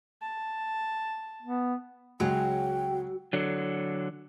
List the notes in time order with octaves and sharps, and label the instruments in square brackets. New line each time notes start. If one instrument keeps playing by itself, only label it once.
[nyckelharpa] A5
[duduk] B3
[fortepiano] C#2 G#3 [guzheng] F#3 [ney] G5
[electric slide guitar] D3 F#3